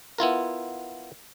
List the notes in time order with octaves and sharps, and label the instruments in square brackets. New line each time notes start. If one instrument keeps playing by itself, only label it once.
[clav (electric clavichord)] B3 E4 F4 A#4